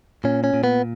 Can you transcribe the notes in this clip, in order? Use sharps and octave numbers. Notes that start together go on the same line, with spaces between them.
A#2 C#4
C#4
A#2
B3